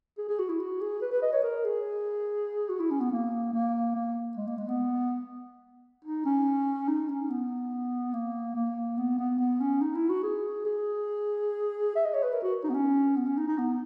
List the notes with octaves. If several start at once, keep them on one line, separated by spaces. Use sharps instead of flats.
G#4
G#4
F#4
E4
F#4
G#4
B4
B4
D#5
C#5
A#4
G#4
F#4
E4
C#4
B3
A#3
A#3
A#3
G#3
A#3
G#3
B3
D#4
C#4
D#4
C#4
B3
A#3
A#3
B3
B3
B3
C#4
D#4
E4
F#4
G#4
G#4
E5
D#5
C#5
B4
A#4
F#4
D#4
B3
C#4
B3
C#4
D#4
D#4
B3